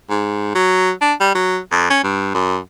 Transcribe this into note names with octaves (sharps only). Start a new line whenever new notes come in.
G#2
F#3
D4
G3
F#3
F2
C#4
G2
F#2